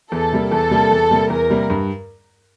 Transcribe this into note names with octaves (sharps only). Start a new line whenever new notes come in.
E2 A4
C3 G3 A#3
E2 A4
C3 G3 A#3
E2
C3 G3 A#3
E2 A#4
C3 G3 A#3
G2